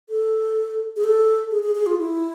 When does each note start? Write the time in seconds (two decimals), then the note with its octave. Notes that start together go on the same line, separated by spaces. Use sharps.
0.09 A4
0.96 G#4
1.04 A4
1.51 G#4
1.63 G#4
1.75 G#4
1.86 F4
1.98 E4